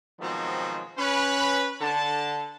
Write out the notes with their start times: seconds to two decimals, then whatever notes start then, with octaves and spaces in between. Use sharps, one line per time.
0.20 B2 D#3 F3 F#3 G#3 C4
0.98 C#4 B4
1.81 D3 A5